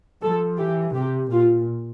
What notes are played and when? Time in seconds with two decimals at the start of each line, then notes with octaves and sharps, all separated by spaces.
0.22 F3 A4
0.58 E3 G4
0.94 C3 G4
1.31 A#2 F4